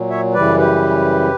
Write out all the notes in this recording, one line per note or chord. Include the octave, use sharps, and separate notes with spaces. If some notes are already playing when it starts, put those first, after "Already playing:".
Already playing: A#2 F#3
C#5 E5
F#2 C#3 E3 G3 B4 D5
G4 B4